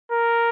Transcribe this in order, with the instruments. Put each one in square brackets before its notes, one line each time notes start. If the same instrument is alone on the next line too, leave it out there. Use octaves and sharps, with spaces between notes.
[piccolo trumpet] A#4